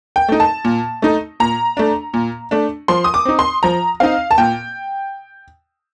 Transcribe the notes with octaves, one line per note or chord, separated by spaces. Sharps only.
G5
A3 D#4
A5
A#2
A3 D#4
A#2 A#5
A3 D4
A#2
A3 D4
F3 C6
D#6
D6
C4 D#4
C6
F3 A#5
C4 D#4 F5
A5
A#2 G5